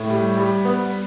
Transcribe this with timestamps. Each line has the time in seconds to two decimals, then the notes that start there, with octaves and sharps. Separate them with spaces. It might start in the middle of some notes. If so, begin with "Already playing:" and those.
Already playing: A2
0.10 G3
0.37 G3
0.65 B3